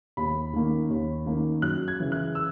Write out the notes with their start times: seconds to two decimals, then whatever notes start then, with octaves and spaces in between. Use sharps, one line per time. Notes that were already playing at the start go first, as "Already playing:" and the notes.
0.17 D#2 B5
0.54 D#3 A#3 C#4
0.90 D#2
1.26 D#3 A#3 C#4
1.62 F#2 F#6
1.88 G#6
2.00 C#3 E3
2.12 F#6
2.35 E6